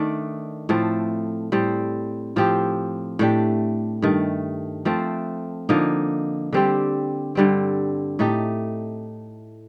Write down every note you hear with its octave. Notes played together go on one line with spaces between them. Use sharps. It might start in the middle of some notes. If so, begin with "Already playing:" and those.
Already playing: D#3 A3 D4
A2 F3 A3 C4
A2 G3 C4
A2 F3 C4 G4
A2 A3 D4 G4
G2 D#3 A3
F3 A3 C4
D3 F3 A#3 D#4
D3 G3 C4 G4
G2 D3 G3 C4
A2 A3 D#4 G4